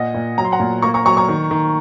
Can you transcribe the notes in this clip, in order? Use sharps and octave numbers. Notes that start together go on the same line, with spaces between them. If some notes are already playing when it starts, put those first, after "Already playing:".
Already playing: A#2 D#5 F#5
A#2
F#3 A#5
C6
F#5 A#5
A#2
A#3 A#5 C#6
A#5 C#6
F#3 A#5 C#6
A#5 C#6
D#3
D#3